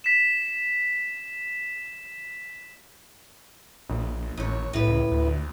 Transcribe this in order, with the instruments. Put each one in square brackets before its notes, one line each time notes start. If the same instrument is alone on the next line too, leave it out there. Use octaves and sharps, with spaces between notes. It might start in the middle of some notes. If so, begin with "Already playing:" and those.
[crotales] B6 E7
[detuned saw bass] A#1
[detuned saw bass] A1 [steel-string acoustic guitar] D#2 C#5
[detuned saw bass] B1 [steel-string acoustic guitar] A2 B4
[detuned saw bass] C#2
D2